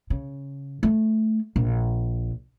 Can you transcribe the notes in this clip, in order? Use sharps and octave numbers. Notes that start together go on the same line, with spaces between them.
C#3
A3
A#1